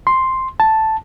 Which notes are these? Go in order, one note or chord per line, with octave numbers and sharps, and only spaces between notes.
C6
A5